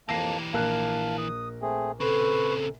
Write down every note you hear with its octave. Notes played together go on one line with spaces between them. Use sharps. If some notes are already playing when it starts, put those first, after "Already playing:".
F2 E3 A#3 G4 A5 A#6 C7
A#1 A#4 F5 A5 F#6
D#6
A3 C4 G#4
C#3 C4 A4 B4 C#6